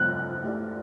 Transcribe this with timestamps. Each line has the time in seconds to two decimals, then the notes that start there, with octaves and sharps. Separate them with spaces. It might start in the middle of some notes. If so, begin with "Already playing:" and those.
Already playing: C#3 F#3 B3 F#6
0.44 A3 E4 G4 D5